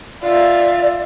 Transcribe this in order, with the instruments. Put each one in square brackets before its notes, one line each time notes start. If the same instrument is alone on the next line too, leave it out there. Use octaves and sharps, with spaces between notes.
[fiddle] F4 E5 [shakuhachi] D5